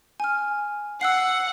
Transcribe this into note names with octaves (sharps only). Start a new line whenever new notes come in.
G#5 F6
F#5 E6 F#6 C7